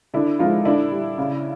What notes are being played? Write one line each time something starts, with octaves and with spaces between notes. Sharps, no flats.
D3 D4 E4
F3 G#3 D#4 F4
D3 D4 E4
G3
C#3